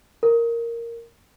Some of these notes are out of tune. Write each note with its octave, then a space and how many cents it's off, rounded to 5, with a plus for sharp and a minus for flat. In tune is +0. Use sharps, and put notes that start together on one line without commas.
A#4 -5